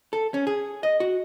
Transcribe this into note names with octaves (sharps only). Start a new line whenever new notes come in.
A4
C#4
G#4
D#5
F#4